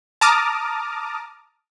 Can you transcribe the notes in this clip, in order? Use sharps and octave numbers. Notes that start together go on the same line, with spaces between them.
A5 A#5 D6 D#6 F6